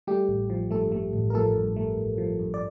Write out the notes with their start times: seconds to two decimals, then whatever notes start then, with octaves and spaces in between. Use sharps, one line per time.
0.07 G3 A3 G4
0.28 A1
0.50 F3
0.71 G2 A3 A4
0.92 A3
1.13 A1
1.30 A#4
1.34 F3 A3 A4
1.55 G2
1.76 A3
1.98 A1
2.18 F3
2.39 G2
2.54 D5